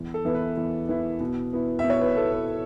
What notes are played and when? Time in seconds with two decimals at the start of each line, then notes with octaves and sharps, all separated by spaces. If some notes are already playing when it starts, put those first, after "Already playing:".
Already playing: E2
0.14 A4
0.25 E3 B3 E4
0.35 B4
0.57 E2
0.89 E3 B3 E4
1.20 B2
1.53 B3 E4
1.79 E5
1.84 B2
1.90 C#5
2.01 B4
2.17 B3 E4 A4
2.32 B4